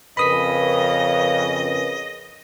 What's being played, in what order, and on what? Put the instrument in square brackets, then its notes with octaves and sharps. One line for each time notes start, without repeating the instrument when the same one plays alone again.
[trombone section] F2 C#3 [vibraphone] A#4 B4 [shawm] D#5 [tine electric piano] B5 D#6 B6